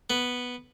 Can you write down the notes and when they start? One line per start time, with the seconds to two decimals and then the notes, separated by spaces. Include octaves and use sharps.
0.10 B3